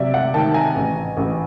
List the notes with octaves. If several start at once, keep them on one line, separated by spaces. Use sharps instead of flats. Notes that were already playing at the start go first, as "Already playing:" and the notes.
Already playing: C3 F#3 D5 E5
E5 F#5
D#3 G5 A5
G#5 A#5
A1
A1